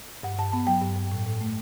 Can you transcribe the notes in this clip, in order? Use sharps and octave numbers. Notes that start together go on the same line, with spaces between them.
G2 F#5
G2 A5
B3 A5
F#3 G5
G2
G2
A2
A2
A3